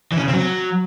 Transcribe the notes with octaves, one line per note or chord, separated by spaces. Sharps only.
E3
C#4
C#3
C4
F#3